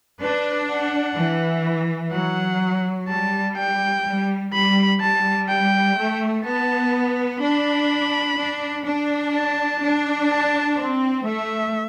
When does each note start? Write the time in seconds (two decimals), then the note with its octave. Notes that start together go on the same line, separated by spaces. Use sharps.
0.20 D4 B4
0.69 F#5
1.17 E3
2.12 F#3 F#5
3.08 G3 A5
3.57 G5
4.05 G3
4.53 G3 B5
5.00 G3 A5
5.48 G5
5.97 A3
6.45 B3 A5
7.41 D4 B5
8.37 D4
8.84 D4
9.34 A5
9.81 D4
10.29 A5
10.77 C4
11.26 A3 E5